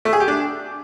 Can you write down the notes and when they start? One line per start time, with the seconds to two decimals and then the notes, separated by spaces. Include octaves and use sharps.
0.05 A3
0.13 G#4
0.20 G4
0.28 D4